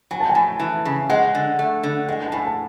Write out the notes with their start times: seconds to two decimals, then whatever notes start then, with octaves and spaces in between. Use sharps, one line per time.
0.11 F#3 G#5
0.20 A5
0.29 G#5
0.35 A2
0.60 E3
0.85 C#3
1.10 G#3 F#5
1.35 D3
1.59 A3
1.83 D3
2.08 G#3 F#5
2.20 F#5
2.27 A5
2.32 A2 G#5
2.45 A5